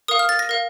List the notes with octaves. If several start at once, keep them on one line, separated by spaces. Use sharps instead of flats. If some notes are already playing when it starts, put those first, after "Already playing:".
A#4 F5 D#6
F6
A6
A#6
A#4 F5